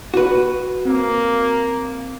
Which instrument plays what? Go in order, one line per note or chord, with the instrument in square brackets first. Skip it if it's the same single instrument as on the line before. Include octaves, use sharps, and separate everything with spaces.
[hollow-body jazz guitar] F#4 B4
[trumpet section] A#3 [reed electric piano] C4